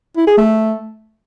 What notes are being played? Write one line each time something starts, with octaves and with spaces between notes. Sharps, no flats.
E4
G#4
A3